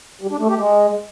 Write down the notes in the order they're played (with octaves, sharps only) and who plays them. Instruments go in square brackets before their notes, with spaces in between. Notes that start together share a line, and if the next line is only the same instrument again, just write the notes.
[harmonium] G3
D4
A3
G4
G#3